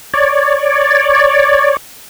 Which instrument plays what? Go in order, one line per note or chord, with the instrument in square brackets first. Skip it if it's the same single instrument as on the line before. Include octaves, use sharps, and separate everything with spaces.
[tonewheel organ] C#5 D5